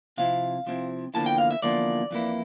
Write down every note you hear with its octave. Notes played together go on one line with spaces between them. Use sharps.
C3 F3 C4 E4 F5
C3 F3 C4 E4
E2 D3 F3 A#3 E4 A5
G5
F5
E5
E2 D3 F3 A#3 E4 D5
F2 E3 A#3 E4